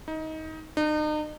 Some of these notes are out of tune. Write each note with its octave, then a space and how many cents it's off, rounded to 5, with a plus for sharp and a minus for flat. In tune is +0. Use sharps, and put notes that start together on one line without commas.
D#4 +20
D#4 -40